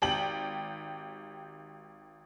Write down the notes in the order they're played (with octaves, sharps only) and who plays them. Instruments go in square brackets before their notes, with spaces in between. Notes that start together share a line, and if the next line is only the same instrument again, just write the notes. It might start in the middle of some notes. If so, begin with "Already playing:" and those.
[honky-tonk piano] G#1 G4 G5 F#7